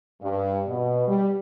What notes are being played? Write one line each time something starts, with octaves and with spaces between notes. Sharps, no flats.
G2
B2
G3